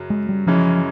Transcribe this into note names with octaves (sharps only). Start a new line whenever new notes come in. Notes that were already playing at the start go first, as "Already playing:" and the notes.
Already playing: F#2 C#3 F#3
G#3
G3
F#2 C#3 E3 F3 G#3 C#4